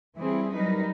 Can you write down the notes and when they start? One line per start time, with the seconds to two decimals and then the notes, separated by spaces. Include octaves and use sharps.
0.17 E3 G3 C4 E4 G#4
0.54 F#3 G3 D#4 A#4 B4